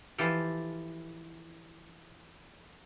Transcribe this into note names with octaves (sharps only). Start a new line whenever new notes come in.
E3 F3 F4 G4 A4